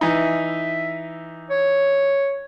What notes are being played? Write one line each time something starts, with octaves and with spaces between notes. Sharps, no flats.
E3 D#4 E5
C#5